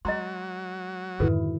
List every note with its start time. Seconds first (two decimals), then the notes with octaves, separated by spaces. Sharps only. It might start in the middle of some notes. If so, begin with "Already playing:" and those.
0.05 F#3 G#3 D#5 A#5 C6
1.20 F2 G#2 D3 D#3 E4 F#4 A4 B4